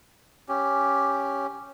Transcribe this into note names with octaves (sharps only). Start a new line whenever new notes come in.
C#4 G4